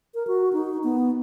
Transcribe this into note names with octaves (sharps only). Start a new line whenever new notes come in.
A#4
F#4
D#4
B3